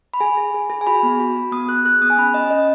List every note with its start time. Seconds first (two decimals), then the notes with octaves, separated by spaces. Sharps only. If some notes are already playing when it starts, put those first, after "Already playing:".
0.14 B5
0.20 G#4 G#5
0.37 G#4
0.54 G#4
0.70 G#4
0.81 G#5
0.87 F#4 B5
1.03 B3
1.20 F#4
1.36 F#4
1.52 B3 D#6
1.68 G#4 F#6
1.85 G#4 F#6
2.02 B3 D#6
2.10 G#5
2.18 C#4 B5
2.34 C#4 D#5
2.51 C#4 D#5